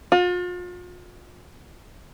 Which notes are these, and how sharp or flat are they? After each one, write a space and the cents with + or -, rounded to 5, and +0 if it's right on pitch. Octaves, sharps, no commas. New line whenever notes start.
F4 +40